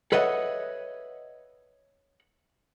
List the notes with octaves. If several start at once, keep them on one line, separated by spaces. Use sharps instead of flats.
A4 B4 C#5 D#5 E5 F#5